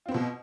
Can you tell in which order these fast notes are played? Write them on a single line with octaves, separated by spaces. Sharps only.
F4 C4 B3 B2